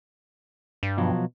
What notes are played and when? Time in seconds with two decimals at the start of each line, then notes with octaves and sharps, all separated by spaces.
0.83 G2
0.97 B2 F3 F#3